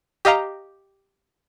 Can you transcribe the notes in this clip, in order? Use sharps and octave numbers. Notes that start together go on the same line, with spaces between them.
G4 D#5 F5 A#5